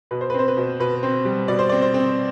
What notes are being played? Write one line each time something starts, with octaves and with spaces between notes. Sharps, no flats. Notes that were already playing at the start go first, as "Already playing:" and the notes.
B2 B4
C5
B4
C4 C5
B4
B2
B2 B4
C4
G3
B2 D5
C5
C4 D5
C5
C4